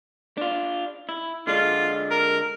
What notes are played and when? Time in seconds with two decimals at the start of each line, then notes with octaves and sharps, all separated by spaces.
0.37 D4 F4
1.09 E4
1.47 D3 G#3 D4 F4
2.11 A#4